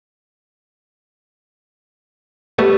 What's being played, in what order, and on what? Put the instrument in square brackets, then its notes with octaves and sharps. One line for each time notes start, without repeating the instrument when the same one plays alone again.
[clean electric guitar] G3 A3 B3 [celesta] G4 C#6